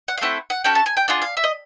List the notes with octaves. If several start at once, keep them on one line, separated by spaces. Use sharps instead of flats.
F#5
F5
A3 C4 E4 A4 F#5
F#5
C#4 F#4 A4 G5
A5
G#5
G5
D4 F4 G#4 F#5
F5
E5
D#5